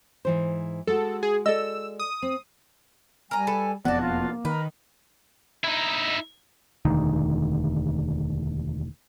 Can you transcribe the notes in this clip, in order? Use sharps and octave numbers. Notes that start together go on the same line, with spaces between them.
G#2 E3 C5
G#3 F#4 A4
G#4
A4 D5 D#5 E6
D#6
C4
G3 A#4 G#5 A#5
A4 B4
E1 F2 B3 F#4 D5 A5
A#3 F4
D#3 A#4 B4
D#4 E4
E1 D2 D#3